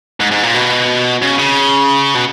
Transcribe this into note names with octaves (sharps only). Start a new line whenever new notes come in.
G#2
G#2
A#2
B2
C#3
C#3
B2